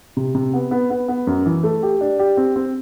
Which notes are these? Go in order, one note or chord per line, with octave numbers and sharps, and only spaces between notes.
C3
C3
B3
B3
B3
B3
F#2
E3
A3
G4
D4
G4
C4
C4